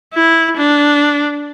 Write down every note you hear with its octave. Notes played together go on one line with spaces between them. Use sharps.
E4
D4